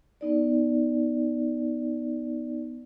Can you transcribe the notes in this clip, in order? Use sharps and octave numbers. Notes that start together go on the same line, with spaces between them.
B3 D#4 D5